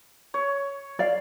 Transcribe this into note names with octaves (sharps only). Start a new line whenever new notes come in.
C#5
D5 F5